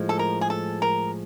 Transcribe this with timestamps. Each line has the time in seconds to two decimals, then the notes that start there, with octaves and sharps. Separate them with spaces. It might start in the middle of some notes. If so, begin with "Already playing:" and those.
Already playing: A2 F3 G#3
0.09 A4
0.19 A#4
0.41 G#4
0.50 A4
0.82 A#4